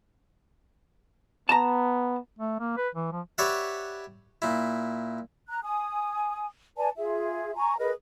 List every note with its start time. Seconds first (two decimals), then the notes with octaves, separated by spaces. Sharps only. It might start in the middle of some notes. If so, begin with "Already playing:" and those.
1.49 B3 A5 A#5
2.39 A3
2.59 A#3
2.77 B4
2.95 E3
3.12 F3
3.38 G4 B4 C#5 D5 E5 F#5
4.42 A#2 E4
5.48 A#5 F#6
5.64 G#5 D#6
6.77 B4 D5 G#5 A5
6.97 F4 G#4 E5
7.56 G#5 A#5 C#6
7.78 G#4 A#4 B4 D#5